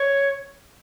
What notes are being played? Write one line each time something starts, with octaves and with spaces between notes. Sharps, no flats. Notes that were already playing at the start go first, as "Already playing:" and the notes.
Already playing: C#5